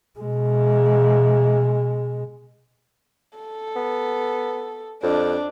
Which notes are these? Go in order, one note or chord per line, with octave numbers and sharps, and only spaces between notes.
B2 G#3
A4
B3
F2 D4